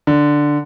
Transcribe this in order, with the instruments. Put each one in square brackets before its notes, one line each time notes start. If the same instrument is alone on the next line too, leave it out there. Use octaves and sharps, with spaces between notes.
[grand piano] D3